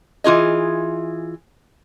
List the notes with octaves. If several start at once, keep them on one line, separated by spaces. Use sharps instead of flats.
E3 F4 G#4 D#5